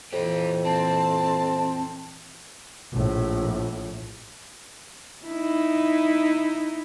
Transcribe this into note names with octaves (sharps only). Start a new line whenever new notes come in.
F2 A#2 E3 F3 G4
C4 A5
A#1 A2
D#4 E4